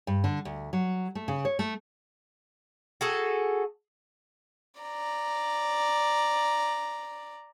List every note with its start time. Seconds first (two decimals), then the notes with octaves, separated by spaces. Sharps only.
0.07 G2
0.24 D3
0.45 D2
0.73 F#3
1.15 A3
1.28 C#3
1.45 C#5
1.59 A3
3.01 F#4 G#4 A4
4.81 D5 A#5